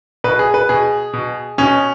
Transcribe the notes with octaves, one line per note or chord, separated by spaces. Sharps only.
B2 B4
G#4
B4
B2 G#4
B2
B2 C#4